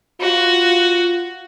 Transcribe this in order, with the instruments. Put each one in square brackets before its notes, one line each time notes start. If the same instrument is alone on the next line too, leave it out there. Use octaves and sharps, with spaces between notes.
[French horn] F4 [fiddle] F#4